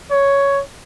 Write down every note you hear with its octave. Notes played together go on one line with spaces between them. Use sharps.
C#5